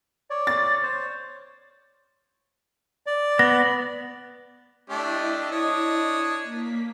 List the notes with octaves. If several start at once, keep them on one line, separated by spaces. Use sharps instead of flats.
C#5 D5
A6
C5 C#5
D5
B3 A#6
A3 D4 E4 G4 D#5
D4 C#5 D#6
A#3 B6